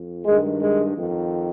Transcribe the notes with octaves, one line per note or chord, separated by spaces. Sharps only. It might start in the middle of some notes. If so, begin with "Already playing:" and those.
Already playing: F2
G2 D#3 G#3
G#3
F2 D#3